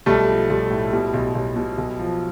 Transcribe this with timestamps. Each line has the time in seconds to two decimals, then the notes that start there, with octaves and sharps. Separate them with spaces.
0.06 B1 G3 A3
0.28 F3
0.50 B1 G3
0.70 A2
0.93 B2 G3
1.14 B1
1.35 B1
1.56 B2
1.78 B1
1.99 F3